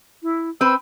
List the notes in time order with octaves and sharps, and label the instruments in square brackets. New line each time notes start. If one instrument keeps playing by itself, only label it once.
[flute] E4
[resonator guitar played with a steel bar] C4 B4 [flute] E6